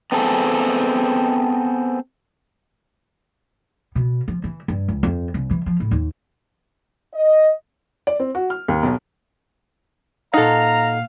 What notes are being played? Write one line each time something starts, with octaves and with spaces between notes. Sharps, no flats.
B3 C4 G#4 A4
B2
F3
E3
G2
C#2
F2
C2
E3
F3
A2
D#2
D#5
D5
C4
F#4
F6
D#2
B1
A#2 D#4 A4 F5 F#5 A#5